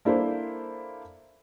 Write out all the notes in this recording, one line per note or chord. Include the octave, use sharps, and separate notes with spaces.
A#3 D4 E4 A4 C5